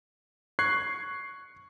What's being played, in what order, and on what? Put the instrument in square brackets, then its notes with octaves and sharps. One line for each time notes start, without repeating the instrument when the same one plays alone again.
[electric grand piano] C#6 F#6 G#6 C7